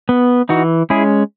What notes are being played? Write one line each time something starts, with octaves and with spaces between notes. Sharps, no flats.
B3
E3 D#4 F#4
G#3 C#4 E4 G#4